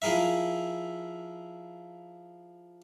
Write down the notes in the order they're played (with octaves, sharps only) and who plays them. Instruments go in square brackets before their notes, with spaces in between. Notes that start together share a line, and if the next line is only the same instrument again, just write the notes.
[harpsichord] F3 E4 G#4 A#4 E5